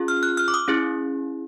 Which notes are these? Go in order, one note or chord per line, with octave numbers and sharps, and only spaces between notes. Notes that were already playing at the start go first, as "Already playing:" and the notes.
Already playing: C#4 F4 G#4
F6
F#6
F6
D6
D#6
C#4 E4 G#4